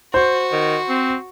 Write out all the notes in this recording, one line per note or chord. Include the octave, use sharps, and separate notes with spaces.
F#4 C5
D#3
C4